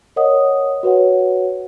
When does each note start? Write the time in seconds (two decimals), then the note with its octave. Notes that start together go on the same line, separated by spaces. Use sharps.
0.16 A#4 C#5 D#5 F#5 D#6
0.83 F#4 B4 C#5 F#5